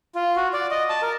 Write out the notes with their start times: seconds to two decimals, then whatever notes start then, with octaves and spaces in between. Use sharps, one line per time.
0.15 F4
0.36 F#4
0.53 D5
0.71 D#5
0.90 A5
1.02 A#4